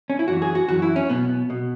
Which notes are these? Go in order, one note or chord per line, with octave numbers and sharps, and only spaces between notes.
C#4
E4
F#2 E3 F#4
G#4
F#4
F#2 E3 F#4
E4
C#4
B1 B2 B3
B2